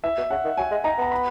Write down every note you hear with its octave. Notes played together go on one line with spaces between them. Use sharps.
E3 E5
B2
C#3 F#5
D#3
F#3 G#5
G#3
D#4 A#5
B3 A#5
B5